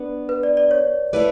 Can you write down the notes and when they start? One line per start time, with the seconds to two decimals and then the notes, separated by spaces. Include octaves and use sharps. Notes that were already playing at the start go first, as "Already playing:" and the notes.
Already playing: B3 D4 B4
0.29 B4
0.43 D5
0.57 D5
0.71 C#5
1.13 A3 E4 B4 D5